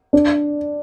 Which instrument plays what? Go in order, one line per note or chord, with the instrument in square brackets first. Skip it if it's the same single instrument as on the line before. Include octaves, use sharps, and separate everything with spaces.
[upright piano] D4